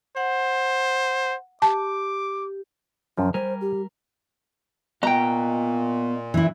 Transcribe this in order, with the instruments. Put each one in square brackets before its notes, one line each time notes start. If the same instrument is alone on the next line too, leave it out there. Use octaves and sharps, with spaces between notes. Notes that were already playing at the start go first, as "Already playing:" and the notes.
[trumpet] C5 [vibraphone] F#5
[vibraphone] G4 [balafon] A5 [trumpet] D6
[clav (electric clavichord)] F#2 F3 [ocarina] C#4
[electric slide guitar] G3 A#4 [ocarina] C5 [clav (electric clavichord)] G#5
[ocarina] G4
[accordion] A#2 [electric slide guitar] B3 D#5 [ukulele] G5 A#5
[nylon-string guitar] E3 E4